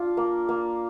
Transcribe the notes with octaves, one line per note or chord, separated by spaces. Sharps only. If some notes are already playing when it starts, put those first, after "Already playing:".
Already playing: D4 F4
A#3
A#3